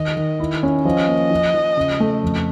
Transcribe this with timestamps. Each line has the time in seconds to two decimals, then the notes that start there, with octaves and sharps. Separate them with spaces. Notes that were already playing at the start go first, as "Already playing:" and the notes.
Already playing: D#3 D#5
0.17 D#3
0.40 E4
0.63 C#4
0.85 F3 D#5
1.08 A#3
1.31 F3
1.54 F3
1.77 C#3
2.00 A3
2.23 F2